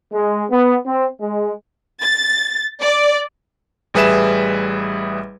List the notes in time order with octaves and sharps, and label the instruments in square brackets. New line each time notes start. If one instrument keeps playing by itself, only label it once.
[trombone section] G#3
B3
C4
G#3
[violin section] A6
D5
[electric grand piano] A1 G3 G#4 B4 E5 E7